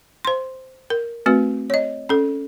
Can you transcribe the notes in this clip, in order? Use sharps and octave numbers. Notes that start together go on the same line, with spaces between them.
C5 C6
A#4
A3 C4 F#4 B4
C#5 D#5
C#4 A4